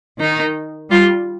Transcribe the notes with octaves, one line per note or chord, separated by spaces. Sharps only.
D#3 D#4
G3 F4